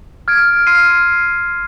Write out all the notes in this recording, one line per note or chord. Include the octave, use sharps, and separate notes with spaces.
F6 G#6 D7
C6 F6 C7 D#7